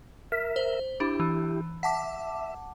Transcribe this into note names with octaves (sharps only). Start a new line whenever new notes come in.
A#4 E5 B6
C5
D4 E4 G4
E3
E5 F#5 A5 D6